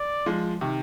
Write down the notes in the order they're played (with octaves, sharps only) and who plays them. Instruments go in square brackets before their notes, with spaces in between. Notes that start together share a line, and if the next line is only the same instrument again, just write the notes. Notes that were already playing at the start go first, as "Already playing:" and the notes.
Already playing: [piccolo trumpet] D5
[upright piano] F3 G#3
C3 D#3